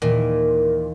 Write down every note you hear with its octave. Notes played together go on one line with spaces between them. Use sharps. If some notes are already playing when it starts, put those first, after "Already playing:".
D#2 A#2 E3 A#4